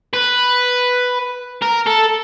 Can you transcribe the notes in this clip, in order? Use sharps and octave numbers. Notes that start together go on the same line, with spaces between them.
B4
A#4
A4